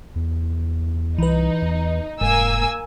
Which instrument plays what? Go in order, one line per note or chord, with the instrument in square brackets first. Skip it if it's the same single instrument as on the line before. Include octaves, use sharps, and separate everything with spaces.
[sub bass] E2
[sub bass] C2 [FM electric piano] E3 B4 [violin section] D#4
[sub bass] E2
[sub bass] F1 [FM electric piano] G#2 [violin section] A#3 G#5 E6